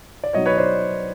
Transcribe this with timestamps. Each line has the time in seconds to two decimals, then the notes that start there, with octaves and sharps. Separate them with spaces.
0.24 D5
0.33 B2 F#3 B3 D#4 C#5 D#5
0.46 B4 C#5
0.58 C5 D5